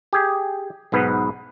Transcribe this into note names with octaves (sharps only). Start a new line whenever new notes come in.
G4 G#4
B1 G#2 B3 B4